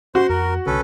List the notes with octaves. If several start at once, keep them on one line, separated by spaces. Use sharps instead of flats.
C#4 F#4 C5 C6
F2 A#4
C2 D3 C#4 A4 B4